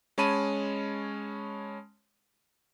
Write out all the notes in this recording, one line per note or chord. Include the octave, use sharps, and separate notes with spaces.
G#3 C#4 C#5 A5 B5 D#7